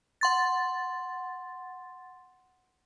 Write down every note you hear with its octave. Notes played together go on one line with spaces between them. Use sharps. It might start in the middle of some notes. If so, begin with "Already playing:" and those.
F#5 C6 A6